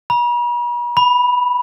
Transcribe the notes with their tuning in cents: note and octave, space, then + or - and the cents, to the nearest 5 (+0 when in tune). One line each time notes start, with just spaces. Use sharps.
B5 -45
B5 -5